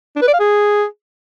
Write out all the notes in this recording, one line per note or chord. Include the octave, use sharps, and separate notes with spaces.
D4
B4
D5
F5
G#4